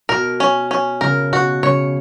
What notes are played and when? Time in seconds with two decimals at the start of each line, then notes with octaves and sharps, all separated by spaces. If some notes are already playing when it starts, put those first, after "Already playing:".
0.09 B2 A#4
0.40 C#4
0.71 C#4
1.01 C#3 A#4
1.32 B2 F#4
1.63 C#3 C#5